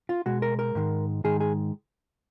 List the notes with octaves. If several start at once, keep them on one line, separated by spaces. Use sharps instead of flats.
F4
B2 G#3 F#4
A#4
A#4
G#2 D#3 G#3
G#2 D#3 G#3 G#4
G#4